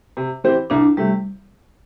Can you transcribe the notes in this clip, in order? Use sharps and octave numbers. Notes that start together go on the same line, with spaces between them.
C3
E3 C4 G4 C5
C2 D4
C3 G3 A3